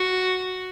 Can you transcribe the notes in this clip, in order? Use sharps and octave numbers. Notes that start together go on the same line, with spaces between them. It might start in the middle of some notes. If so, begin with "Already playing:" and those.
Already playing: F#4